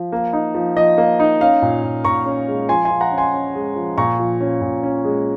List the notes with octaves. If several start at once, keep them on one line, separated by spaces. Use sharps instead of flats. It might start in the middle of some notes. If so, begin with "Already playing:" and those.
Already playing: F3
A#3
D#4
F3
F3 D#5
A#3
D#4
C#4 F5
A#2
A#2
A#2 A#5 C#6
C#4
G#3
F3 G#5 C6
G#5 C6
F3
F#5 A#5
C#4
G#5 C6
C#4
G#3
F3
A#2 A#5 C#6
F3
C#4
A#2
C#4
G#3